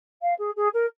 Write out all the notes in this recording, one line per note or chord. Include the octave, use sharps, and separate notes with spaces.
F5
G#4
G#4
A#4